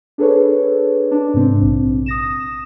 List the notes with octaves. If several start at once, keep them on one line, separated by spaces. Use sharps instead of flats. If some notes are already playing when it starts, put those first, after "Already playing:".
D4 G#4 A4 B4 C#5
D4
G#2 C3 C4
A#1
D#6 A#6 E7